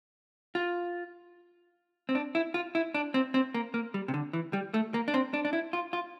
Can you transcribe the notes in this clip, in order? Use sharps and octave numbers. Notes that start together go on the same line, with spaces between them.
F4
C4
D4
E4
F4
E4
D4
C4
C4
A#3
A#3
G3
C3
D3
E3
G3
A3
A#3
D4
C4
D4
D4
E4
F4
F4